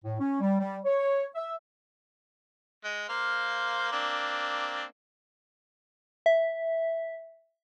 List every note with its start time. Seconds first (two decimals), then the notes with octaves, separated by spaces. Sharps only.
0.04 A2
0.20 C#4
0.40 G3
0.59 G3
0.84 C#5
1.35 E5
2.84 G#3
3.09 A#3 C5 F5
3.92 A#3 C4 D4
6.26 E5